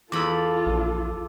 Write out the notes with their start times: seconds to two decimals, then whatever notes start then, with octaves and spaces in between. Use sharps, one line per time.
0.12 E2 F4 A4 B5 D6 E6
0.67 A#1